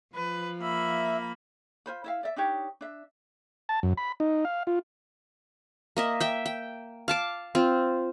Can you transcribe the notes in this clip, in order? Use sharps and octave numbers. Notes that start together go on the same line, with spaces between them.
F3 B4
A#3 E5 B5
F4 C5 B5
E4 E5 F5
D5 E5
D4 D#4 G4 C#5
D4 E5
A5
F#2
B5
D#4
F5
F4
A#3 D#5 E5
E5 G5
G5
F5 A5 D6
C4 F4